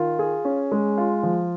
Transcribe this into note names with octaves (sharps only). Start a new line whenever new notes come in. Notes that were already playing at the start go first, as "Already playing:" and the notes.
Already playing: D#3 F4
G#4
C#4
G#3
F4
F3